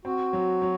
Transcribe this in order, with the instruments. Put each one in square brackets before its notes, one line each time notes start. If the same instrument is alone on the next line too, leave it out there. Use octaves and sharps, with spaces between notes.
[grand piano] C4 [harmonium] F#4
[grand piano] F#3
F#3